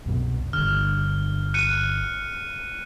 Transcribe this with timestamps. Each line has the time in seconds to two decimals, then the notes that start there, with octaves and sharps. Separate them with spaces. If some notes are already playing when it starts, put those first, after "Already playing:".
0.06 C2 F#2 B2
0.53 G1 D3 F6
1.54 F#6 C#7 D#7